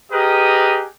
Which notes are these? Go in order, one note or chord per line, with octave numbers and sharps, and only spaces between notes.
G4 G#4 A#4 B4 D#5